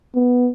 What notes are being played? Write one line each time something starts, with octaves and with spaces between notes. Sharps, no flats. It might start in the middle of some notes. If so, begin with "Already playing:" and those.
B3